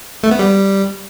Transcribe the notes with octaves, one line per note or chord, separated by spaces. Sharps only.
A3
B3
G3